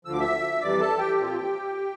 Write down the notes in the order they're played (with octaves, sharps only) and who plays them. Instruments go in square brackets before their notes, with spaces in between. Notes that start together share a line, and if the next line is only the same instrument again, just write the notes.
[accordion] D2 D3 F3 E6
D6
E5 E6
F2 C3 E3 G3 D5 D6
A4 A5
G4 G5
A#2 F3 C4 F4